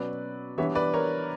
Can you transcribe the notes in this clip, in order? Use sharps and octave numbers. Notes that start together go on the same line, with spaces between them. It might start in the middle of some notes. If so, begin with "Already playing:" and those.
Already playing: B2 F#3 C#4 B4 D5
E3 G3 B3 D4 C#5 E5
B4 D5
A#4 C#5